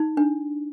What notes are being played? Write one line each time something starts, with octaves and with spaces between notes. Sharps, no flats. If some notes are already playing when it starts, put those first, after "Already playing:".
Already playing: D#4
D4